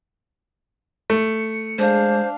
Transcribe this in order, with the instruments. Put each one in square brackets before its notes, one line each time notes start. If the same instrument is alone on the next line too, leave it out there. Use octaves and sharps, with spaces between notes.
[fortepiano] A3 [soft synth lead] C#7
[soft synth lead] G#3 [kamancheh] D4 F5 [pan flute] C5